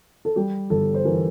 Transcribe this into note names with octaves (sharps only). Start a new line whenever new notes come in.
A4
G3 G4
G1 A4
C5
E3 A#4